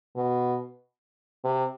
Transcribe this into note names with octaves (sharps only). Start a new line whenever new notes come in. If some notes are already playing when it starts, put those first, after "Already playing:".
B2
C3